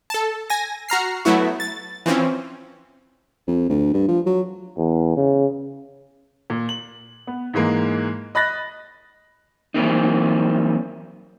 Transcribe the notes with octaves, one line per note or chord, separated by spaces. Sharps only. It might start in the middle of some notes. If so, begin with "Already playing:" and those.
A4 A5
G#5 A#6
F#4 A#5 F6 C7
F#3 A3 B3 E4 F#4
A6
E3 F3 C4 C#4
F2
D2
G2
F3
F#3
E2
C#3
A#2
F#7
B3
G#2 E3 G#3 A#3
D#5 B5 F#6 A6 A#6
E3 F#3 G3 A#3 C4 D#4